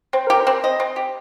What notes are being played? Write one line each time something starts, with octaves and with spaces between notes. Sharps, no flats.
C4 C5
G4 A#4
C5
C4
D#5
C4
G4